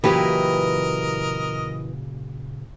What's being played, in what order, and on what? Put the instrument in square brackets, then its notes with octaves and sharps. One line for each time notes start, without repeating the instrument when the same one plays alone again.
[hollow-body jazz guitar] A#2 C#3 F#3 [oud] E3 G4 [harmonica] A#4 D#5 [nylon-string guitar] B4